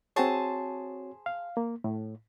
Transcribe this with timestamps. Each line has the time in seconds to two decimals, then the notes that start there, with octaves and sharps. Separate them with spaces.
0.16 C4 F#4 G#4 C5 C#5 A5
1.26 F5
1.57 A#3
1.84 A2